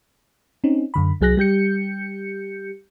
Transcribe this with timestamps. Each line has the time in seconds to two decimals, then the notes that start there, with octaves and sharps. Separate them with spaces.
0.64 C4 C#4 D#4
0.94 F#2 D3 B5
1.21 C2 F#3 G#4 F#6 A#6
1.37 G3 G4 G6 C#7